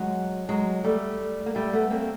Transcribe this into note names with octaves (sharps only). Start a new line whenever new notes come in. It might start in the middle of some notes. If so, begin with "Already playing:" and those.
Already playing: F#3 G#3
F#3 G#3
G3 A3
A#3
G3 A3
A3 B3
A#3 C4